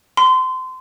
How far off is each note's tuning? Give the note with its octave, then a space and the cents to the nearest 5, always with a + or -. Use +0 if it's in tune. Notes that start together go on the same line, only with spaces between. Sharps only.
C6 -25